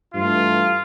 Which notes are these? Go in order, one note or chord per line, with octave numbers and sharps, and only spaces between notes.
G2 E3 A3 F4